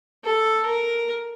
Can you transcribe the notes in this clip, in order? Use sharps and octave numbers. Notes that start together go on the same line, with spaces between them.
A4
A#4